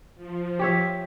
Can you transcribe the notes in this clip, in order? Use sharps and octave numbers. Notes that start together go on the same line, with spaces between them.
F3
G4 C#5 E5